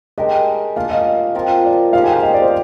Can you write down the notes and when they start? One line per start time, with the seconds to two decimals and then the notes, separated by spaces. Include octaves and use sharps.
0.18 G#3 D4 G4 A#4 D#5
0.76 A#3 D4 F4 F5
0.91 D#5
1.35 F3 C4 F4 A#4
1.65 D5
1.93 F3 G#3 D#4 G4 F5
2.04 G#5
2.13 G5
2.23 D#5
2.33 D5
2.42 C5